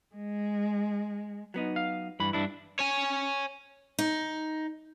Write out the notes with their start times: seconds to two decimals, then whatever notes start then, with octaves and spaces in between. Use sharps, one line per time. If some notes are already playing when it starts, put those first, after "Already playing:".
0.16 G#3
1.54 F#3 B3 D#4
1.76 F5
2.20 G2 E3 B5
2.33 G2 D4 E4
2.79 C#5 G#5
3.99 D#4